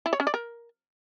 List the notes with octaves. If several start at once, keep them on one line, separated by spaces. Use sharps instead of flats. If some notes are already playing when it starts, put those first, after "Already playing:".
E4
C#5
C#4
D5
A#4